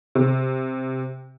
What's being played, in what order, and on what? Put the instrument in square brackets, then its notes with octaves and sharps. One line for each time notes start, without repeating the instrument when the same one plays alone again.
[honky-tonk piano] C3